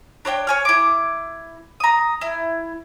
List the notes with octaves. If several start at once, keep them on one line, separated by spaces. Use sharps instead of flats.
D4 C#5 D#5 G5
C#5 G#5 F6
E4 D6
A#5 D#6
E4